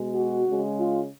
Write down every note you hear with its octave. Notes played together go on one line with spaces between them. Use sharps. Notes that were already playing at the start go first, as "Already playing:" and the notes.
Already playing: B2 G#3
F#4
C#3 G#3
F4